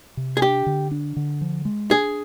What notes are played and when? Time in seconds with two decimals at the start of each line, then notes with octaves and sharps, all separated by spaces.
0.17 C3
0.37 G#4
0.42 D4 G4
0.66 D3
0.91 D4
1.16 D3
1.41 F3
1.65 G#3
1.91 D4 G#4